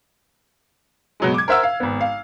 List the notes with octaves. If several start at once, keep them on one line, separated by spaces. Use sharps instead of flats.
B2 F#3 G#3
D6 G#6
A#4 C5 E5 F#5 E6
F5
G#1 B3
F5